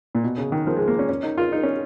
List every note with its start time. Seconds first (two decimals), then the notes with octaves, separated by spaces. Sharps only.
0.15 A#2
0.24 B2
0.38 C#3
0.52 D#3
0.67 F3
0.77 G#3
0.88 A#3
0.99 C#4
1.09 C#4
1.23 D#4
1.38 F4
1.52 D#4
1.63 C#4